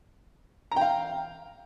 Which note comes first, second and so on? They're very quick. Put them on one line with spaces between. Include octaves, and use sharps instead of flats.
A#5 G5 F5